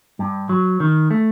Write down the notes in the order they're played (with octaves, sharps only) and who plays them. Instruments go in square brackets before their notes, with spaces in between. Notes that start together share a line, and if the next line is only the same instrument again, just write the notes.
[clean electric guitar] G2
F#3
D#3
A3